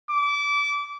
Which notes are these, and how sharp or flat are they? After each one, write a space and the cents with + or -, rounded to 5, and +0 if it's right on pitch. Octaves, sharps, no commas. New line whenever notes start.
D6 -25